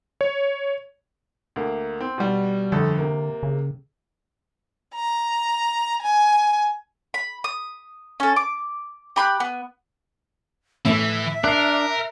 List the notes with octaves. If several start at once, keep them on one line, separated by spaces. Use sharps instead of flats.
C#5
D2 A#3
C4
B2 G3
G1 F2 D3 A4
C3 A#3
C#3
A#5
G#5
B5
D#6
C#4 A4
D6
G4 B5 C6 F#6
B3
A2 E3 A3 E5
D4 A#4 F#6 C7